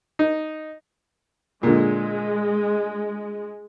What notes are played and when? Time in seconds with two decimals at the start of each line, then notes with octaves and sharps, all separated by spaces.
0.19 D#4
1.63 A#2 D3 G#3